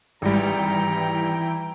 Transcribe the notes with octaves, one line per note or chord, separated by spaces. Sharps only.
G#1 E3 G3 E4 G5 A#5